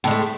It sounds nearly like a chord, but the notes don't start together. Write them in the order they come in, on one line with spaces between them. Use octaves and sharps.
A2 G#3 A3